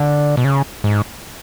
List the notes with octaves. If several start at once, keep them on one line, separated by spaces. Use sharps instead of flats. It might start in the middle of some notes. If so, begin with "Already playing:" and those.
Already playing: D3
B2
C#3
G#2